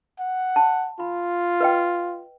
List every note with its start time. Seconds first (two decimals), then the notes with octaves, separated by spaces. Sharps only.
0.19 F#5
0.56 A5
1.00 F4 B5
1.60 B4 D#5 G5